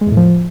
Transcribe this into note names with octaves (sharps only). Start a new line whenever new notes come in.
G#3
E2
A2
F3